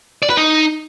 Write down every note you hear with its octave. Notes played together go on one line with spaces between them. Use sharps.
D5
B4
D#4